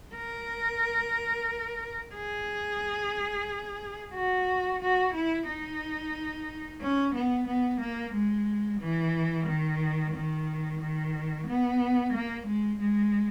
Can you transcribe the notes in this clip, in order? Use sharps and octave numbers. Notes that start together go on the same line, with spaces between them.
A#4
G#4
F#4
F#4
E4
D#4
C#4
B3
B3
A#3
G#3
E3
D#3
D#3
D#3
B3
A#3
G#3
G#3